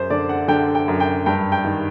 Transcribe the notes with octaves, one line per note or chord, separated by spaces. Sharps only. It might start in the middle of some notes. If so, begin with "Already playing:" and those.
Already playing: F#2 C5
D3 D5
F#5
D3 G5
G5
F#2
G5
G2 G5
G5
D#3